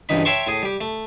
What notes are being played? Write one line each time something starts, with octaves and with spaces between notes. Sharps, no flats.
C#2 G2 E3 D#4 B5
C#5 E5 G5 A5 C6 C#6
A2 G#4
G3 G4
A3